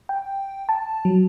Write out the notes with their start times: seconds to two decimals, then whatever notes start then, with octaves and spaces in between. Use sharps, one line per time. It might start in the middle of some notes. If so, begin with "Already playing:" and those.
0.09 G5
0.69 A5
1.05 F#3